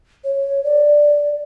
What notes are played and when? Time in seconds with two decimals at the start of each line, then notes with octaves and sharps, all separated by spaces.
0.24 C#5
0.64 D5